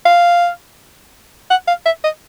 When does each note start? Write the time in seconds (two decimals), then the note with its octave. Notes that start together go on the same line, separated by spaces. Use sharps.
0.05 F5
1.50 F#5
1.68 F5
1.86 E5
2.04 D#5